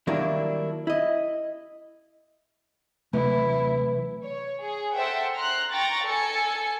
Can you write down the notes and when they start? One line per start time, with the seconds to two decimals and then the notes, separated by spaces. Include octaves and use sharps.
0.07 D#3 F#3 G3 A#3 D4 E4
0.87 E4 D#5
3.13 C3 E3 F#3 A3 C4 E4
4.24 C#5
4.62 G#4
4.94 A4 C5 E5 F#5 G5
5.34 A#5 C6 F6 F#6
5.71 G5 A#5 C#6 A6 A#6
6.03 A4 G#5 C#7